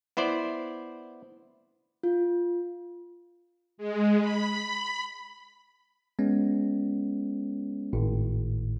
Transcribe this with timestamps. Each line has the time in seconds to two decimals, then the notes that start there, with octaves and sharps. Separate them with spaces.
0.17 B3 E4 C5 D5
2.03 F4
3.78 G#3
4.21 B5
6.19 G#3 B3 C#4
7.93 G#1 A2